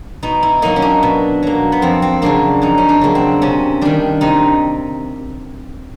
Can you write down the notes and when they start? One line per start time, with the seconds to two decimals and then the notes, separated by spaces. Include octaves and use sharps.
0.23 B2 D#4
0.43 E4
0.62 F#3 A#3 D#4
0.76 C#4
0.82 D4
1.03 B2
1.43 F#3 A#3
1.72 B3
1.82 F2 C4
2.02 C4
2.22 C#3 F#3 A#3 D4
2.62 F2 D#4
2.78 C#4
2.89 D4
3.01 C#3 F#3 A#3
3.15 C4
3.42 C3 C#4
3.81 D#3 G3 D4
4.21 C3 D#4